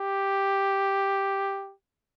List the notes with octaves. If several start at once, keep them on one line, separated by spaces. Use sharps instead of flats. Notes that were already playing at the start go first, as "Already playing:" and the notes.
Already playing: G4